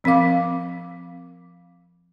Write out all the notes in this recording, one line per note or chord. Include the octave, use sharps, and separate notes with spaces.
F3 C4 A#4 F5 D6